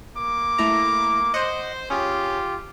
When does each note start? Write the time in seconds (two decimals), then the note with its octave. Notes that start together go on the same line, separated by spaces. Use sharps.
0.16 A#3 D6
0.58 A3 E4 A#5
1.34 C5 D#5 F#5
1.90 C#4 F4 G4 G#4